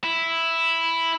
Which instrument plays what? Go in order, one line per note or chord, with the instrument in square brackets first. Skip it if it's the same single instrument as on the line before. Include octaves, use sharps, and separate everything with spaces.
[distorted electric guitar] E4